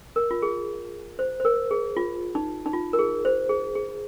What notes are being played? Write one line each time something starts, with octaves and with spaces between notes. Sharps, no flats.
A#4
F4
G#4
C5
C5
A#4
G#4
F4
D#4
D#4
F4
A#4
G#4
C5
G#4
G#4